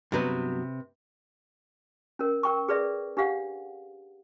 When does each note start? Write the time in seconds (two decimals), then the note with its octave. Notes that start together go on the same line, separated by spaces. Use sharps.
0.12 G2 C3 F#3 B3 B4
2.19 C#4 A#4
2.43 A#4 G5 C#6
2.68 G#4 B4 D5 E5
3.17 D4 G4 F5 F#5